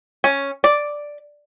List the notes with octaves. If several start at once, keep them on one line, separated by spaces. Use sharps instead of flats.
C#4
D5